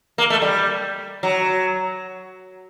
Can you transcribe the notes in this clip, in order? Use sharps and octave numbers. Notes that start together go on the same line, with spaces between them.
A#3
A3
G3
F#3